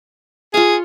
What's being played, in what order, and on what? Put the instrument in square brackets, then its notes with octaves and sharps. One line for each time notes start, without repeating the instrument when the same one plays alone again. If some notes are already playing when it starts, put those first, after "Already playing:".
[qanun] F4 C#5 F5 [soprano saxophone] G#4